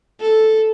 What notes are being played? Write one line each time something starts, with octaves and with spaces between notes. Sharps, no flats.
A4